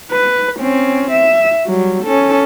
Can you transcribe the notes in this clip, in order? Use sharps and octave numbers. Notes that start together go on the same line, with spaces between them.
B4
C4 C#4
E5
F#3 G3
C#4 A4